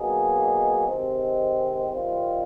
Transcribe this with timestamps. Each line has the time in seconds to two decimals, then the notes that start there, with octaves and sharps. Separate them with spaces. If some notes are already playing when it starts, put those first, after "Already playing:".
Already playing: B2 F#3 A#3 D#4 G#4
0.87 C3 D#3 G#3 C4
1.89 C3 D#3 G3 C4 F4